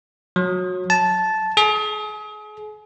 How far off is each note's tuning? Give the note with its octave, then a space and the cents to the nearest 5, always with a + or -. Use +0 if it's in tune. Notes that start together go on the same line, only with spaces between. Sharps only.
F#3 -20
A5 -10
G#4 +35